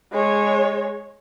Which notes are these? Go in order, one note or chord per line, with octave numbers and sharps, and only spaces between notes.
G#3 C#5